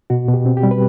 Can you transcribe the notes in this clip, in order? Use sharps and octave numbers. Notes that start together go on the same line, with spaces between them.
B2 F#4
B2
G4
C4
G4
G3
B4